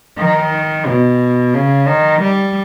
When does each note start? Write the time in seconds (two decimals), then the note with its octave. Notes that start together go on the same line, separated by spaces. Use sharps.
0.19 D#3
0.86 B2
1.54 C#3
1.88 D#3
2.22 G3